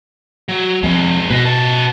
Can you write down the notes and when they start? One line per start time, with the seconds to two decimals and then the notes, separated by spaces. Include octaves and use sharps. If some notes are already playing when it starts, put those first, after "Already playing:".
0.49 F#3
0.83 F2 G#3 B3
1.30 B2 B4 D#5
1.46 B3 A5